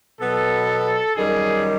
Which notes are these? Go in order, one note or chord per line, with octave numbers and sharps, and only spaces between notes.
B2 F#3 B3 A4
F#2 D#3 G3 G#4